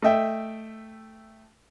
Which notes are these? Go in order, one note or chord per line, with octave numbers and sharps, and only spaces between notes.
A3 D#5 E5 G5